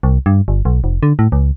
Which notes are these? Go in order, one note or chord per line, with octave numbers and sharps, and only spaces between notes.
C2
G2
G1
B1
F1
D3
A2
C#2